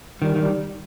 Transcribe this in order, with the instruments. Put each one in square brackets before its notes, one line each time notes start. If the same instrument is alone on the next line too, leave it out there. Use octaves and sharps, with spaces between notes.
[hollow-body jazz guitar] D#3 [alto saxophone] G3
[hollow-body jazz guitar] D#3 [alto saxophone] G3